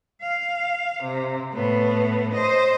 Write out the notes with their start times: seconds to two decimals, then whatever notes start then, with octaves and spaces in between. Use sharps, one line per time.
0.21 F5
1.03 C3
1.53 A2 B3
2.33 C5 D#5